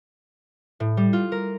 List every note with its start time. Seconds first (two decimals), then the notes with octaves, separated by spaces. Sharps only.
0.80 A2
0.97 G3
1.13 F4
1.32 A#4